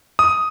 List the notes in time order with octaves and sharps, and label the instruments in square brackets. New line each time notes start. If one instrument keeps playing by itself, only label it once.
[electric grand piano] D#6